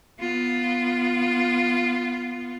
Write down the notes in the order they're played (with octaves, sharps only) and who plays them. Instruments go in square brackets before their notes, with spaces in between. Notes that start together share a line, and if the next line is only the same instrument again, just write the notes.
[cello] B3 F4